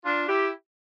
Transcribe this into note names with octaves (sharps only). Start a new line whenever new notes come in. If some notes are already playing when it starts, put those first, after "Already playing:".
D4 F4
E4 G4